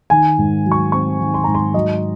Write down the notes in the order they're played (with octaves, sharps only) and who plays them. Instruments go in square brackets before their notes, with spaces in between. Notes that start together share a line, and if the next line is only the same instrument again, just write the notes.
[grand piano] D#3 G#5
G#2
F#3
C#6
C4 C#6
D#3
C6
G#2 A#5
C6
F#3 D#5